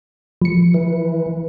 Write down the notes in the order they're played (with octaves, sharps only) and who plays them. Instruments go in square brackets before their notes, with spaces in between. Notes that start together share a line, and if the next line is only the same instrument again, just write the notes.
[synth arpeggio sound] F3 C#7
[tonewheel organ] E3